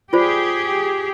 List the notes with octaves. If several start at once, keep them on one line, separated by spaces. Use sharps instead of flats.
F4 G4 G#4 C5 D5